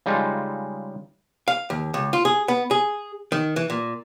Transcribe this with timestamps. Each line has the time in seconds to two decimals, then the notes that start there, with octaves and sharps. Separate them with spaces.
0.06 C#3 G3 G#3 D#4 F4
1.48 F5
1.70 D#2
1.94 C#2
2.13 F4
2.25 G#4
2.48 B3
2.71 G#4
3.32 D#3
3.56 E3
3.70 A#2